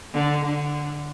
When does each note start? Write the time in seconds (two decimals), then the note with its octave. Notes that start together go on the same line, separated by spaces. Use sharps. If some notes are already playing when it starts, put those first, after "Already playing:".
0.14 D3
0.44 D3